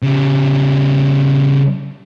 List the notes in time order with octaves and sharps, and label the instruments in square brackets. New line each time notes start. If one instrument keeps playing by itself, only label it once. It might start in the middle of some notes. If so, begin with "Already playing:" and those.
[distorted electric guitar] C#3 G3